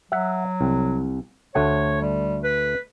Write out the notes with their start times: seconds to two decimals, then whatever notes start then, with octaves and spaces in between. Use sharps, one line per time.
0.12 F#3 E5 F#5
0.61 C2
1.55 D2 A3 C#5 F#5
2.02 G3
2.43 B4